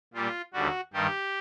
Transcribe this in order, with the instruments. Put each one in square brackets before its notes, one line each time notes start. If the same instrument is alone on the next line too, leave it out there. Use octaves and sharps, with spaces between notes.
[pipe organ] A#2 G3 F4
D#2 D3 G3 F#4
G2 D#3 G3 G4